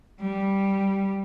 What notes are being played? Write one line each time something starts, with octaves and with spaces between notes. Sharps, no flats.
G3